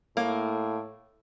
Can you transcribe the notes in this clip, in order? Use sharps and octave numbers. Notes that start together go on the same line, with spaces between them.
A2 A#3